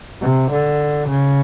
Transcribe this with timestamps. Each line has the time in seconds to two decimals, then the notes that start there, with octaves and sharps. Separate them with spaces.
0.21 C3
0.51 D3
1.08 C#3